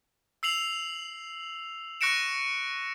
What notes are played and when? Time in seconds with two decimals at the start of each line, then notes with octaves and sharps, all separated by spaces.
0.43 E6 C7 F7 F#7
2.01 C#6 F#6 A#6 C#7 D7 E7